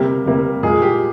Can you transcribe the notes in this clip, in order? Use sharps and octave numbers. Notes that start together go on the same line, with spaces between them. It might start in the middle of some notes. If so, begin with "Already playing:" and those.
Already playing: C3 G3 A#3 G4
C3 G3 A#3
A#2 G#3 G#4
G4